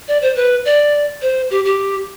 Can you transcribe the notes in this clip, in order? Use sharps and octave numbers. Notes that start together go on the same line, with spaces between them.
D5
C5
B4
D5
C5
G4
G4